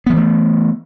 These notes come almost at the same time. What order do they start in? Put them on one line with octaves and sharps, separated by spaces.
B3 F3 E3 A3